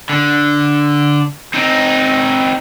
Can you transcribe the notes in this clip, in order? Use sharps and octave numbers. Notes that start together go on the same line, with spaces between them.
D3
C4 D#4